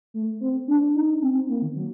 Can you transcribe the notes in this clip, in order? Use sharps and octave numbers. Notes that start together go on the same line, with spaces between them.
A3
C4
D4
D#4
C4
C4
A#3
D#3
F#3